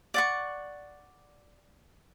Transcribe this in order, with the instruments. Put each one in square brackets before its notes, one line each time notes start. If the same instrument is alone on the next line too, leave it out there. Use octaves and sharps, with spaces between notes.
[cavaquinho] D5 F#5 C#6